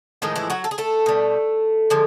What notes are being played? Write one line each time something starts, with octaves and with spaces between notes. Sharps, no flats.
A2 D#3 F3 G#3 D#4
E3 E4
F#3 F#4
A4
G#4
A3 A4
B2 G3
D3 F3 G#3